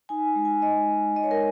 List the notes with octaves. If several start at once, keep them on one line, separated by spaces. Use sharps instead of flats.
D#4 G#5
G#3
G#5
G#3 D#5
G#3
G#3 D#5
C#5
A#4